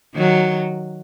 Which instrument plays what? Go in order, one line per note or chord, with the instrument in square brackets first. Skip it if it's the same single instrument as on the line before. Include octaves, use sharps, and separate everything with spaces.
[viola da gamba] D#3 F#3